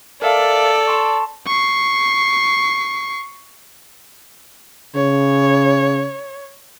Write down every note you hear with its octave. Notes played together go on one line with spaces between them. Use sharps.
A4 A#4 D5 E5 F5
A5 C6 C#6
C#6 C7
C#3 C#5